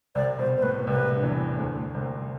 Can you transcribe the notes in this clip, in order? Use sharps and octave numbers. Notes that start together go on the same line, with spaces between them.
C2 C3 D5
B2 C5
C5
A2 B4
C2 C3 B4
D3
E2 E3
D2 D3
C2 C3